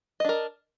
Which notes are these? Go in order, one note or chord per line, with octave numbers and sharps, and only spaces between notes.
D4 A#4 D#5